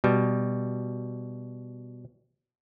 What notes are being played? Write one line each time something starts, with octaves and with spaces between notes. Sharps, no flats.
B2 G3